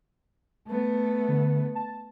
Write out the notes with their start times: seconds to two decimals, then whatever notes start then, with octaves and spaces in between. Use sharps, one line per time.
0.67 A3 B3
1.28 D3
1.75 A5